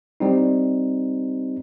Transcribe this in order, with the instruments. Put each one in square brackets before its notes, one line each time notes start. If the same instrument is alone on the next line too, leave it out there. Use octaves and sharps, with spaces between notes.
[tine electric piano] G3 C4 D#4